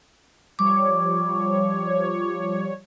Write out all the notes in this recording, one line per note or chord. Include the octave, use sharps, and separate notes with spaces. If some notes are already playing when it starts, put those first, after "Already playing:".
F3 G3 C#5 D6